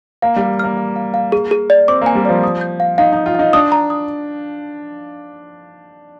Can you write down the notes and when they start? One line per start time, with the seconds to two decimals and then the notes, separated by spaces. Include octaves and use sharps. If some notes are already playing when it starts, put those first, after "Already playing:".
0.22 A#3 F5
0.36 G3 F5
0.59 A#3 F6
0.77 F5
0.96 F5
1.14 F5
1.32 G#4
1.51 G#4
1.70 D5
1.88 C4 D6
2.01 A#3 G#5
2.15 G3
2.25 F3 D5
2.43 D#6
2.61 G6
2.80 F5
2.98 D#4 F5
3.12 D#4 D#6
3.26 F4
3.35 D#4 F5
3.53 D4 D#6
3.72 A#5
3.90 D#6